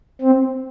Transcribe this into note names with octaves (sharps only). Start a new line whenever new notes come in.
C4